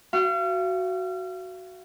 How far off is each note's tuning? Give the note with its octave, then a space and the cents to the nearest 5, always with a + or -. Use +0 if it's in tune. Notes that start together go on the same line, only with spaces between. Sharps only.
F#4 +5 F5 -40